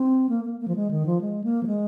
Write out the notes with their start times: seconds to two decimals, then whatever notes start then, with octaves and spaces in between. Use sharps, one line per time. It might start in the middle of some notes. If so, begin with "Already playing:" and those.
Already playing: C4
0.29 A#3
0.45 A#3
0.60 A#3
0.68 F3
0.76 G#3
0.91 D#3
1.06 F3
1.21 G#3
1.44 A#3
1.63 F3
1.67 G#3